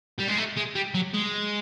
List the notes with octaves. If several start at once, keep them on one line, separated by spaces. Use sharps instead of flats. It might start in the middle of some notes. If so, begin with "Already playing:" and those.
G3
G#3
A3
G#3
G3
F#3
G#3